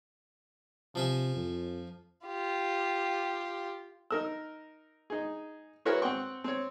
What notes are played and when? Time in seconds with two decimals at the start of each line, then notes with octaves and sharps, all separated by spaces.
0.95 C3 F3 E5 G#5
1.36 F2
2.26 F4 G4
4.11 D#4 A#4 E6
5.10 D#4 G#4
5.85 E4 F#4 G#4 A#4 B4 C#5
6.02 C4 F#5 G5 C#6
6.44 C4 C#5